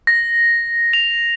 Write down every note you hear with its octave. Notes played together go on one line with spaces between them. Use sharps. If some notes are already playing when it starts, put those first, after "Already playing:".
A#6
F7